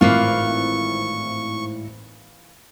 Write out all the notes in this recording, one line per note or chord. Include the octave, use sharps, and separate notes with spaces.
G#1 A2 E3 A#3 F4 C#6